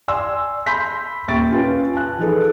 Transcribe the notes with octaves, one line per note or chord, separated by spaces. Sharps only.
D5 G#5 C6 E6
B5 C6 G6 B6
D#1 E5 G5 C#6 A6 D7
C#4 F4 B4
G#5 A5 F#6
F3 D#4 G#4 A4 B4